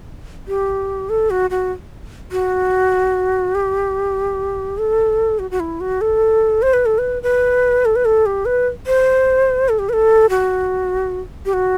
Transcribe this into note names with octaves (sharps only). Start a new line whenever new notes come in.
G4
A4
F#4
F#4
F#4
G4
A4
F#4
F#4
E4
F#4
A4
C5
B4
A4
B4
B4
A4
B4
A4
G4
B4
C5
A4
G4
B4
A4
F#4
G4
F#4